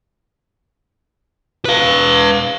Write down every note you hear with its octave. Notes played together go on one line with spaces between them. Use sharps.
B4 F5